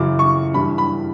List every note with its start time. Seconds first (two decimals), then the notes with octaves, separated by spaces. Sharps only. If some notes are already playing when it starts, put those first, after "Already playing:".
Already playing: F#2 C#3 E3 D6
0.19 C#6
0.54 G2 E3 B5
0.78 B5